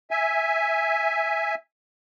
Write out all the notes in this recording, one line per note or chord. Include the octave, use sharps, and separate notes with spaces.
E5 G#5